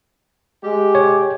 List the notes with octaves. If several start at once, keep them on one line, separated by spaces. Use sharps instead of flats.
G#3 G4
C#5